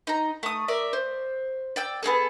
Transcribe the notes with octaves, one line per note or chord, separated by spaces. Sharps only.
D#4 A#5
A3 D#6
A#4 D5 E5
C5
D5 G5 E6
B3 C4 G#4 A4